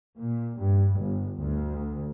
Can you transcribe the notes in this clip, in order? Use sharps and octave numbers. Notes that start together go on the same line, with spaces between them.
A#2
G2
G1
D2